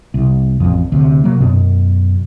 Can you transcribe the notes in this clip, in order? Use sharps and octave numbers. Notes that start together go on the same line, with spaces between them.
C2
A1 F2
D2 C3
C3 F#3 A#3
F#2 B2